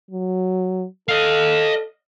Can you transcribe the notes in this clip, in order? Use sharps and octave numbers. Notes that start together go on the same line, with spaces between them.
F#3
A4 D#5 F5